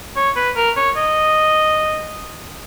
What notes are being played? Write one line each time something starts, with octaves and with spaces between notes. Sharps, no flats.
C#5
B4
A#4
C#5
D#5